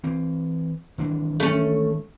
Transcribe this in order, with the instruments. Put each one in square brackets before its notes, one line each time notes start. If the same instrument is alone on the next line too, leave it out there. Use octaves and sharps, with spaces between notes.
[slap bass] E3 C4
G#1 E3 D4
[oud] A3 C#4